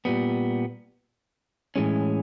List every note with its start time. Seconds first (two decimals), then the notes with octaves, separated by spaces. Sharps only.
0.05 A#2 G3 B3
1.76 A2 E3 G#3 C#4